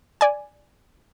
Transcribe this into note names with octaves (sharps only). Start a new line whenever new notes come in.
D5 G#5